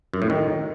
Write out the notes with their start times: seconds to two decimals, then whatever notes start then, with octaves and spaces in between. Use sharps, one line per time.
0.14 F#2
0.22 A2
0.30 D#3